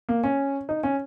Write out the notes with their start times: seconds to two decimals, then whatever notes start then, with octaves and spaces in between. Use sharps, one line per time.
0.09 A#3
0.24 C#4
0.69 D#4
0.83 C#4